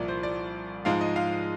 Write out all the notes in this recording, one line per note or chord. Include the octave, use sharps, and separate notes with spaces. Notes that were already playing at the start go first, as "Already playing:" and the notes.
Already playing: C2 A#2 F3 D5
C5
D5
G#2 F3 G#3 F5
D#5
F5